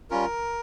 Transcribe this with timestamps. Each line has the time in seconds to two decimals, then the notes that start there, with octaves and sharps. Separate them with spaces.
0.10 G3 C#4 F4 A#4